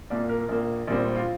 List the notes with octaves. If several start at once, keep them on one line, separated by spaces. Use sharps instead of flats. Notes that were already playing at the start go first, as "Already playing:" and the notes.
C2 A#2 A#3 D5
A#4
A#1 A#2 A#3
A#1 A#2 G3 C4
F4